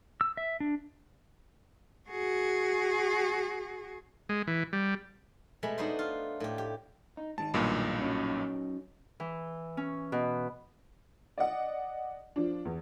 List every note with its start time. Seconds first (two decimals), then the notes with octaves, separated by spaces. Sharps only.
0.21 E6
0.37 E5
0.60 D4
2.10 F#4 G#4
4.29 G#3
4.47 E3
4.73 G3
5.63 B2 G#3 A3 B5
5.78 B3 D4 D#4 F#4 B4 C5
5.99 F4
6.40 A2 G4
6.58 G4
7.17 D#4
7.38 G#2 D#3 A5
7.54 B1 G2 A#2
7.99 F#3 C#4 D#4
9.20 E3
9.77 C#4
10.12 B2
11.38 D5 D#5 F#5
12.36 F3 D4
12.65 E2